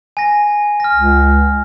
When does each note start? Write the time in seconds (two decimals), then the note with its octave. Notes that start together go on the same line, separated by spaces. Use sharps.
0.17 G#5 A#6
0.80 F6 A#6
0.95 C#2